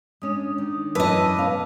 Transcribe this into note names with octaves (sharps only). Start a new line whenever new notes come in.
G#3 C#4 D4 D#6
D#3
F#2 E3 C#4 B4 D#5 A5 D6 E6
B2 C#4 F5